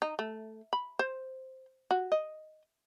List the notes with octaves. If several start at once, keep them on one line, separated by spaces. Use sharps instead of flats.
D#4
A3
B5
C5
F#4
D#5